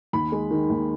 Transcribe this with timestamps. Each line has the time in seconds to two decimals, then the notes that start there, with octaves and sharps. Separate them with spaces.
0.13 D#2 B5
0.32 G#3
0.51 D#3
0.69 D#2